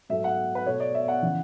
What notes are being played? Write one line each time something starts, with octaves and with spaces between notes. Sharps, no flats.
G#2 F#3 A3 E5
F#5
B4
B2 A3 C#5
D5
E5
F#5
C#3 E3